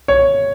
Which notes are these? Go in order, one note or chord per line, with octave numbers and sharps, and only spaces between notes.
C#5